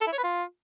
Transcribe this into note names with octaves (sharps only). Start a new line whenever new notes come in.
A4
E4
C#5
B4
F4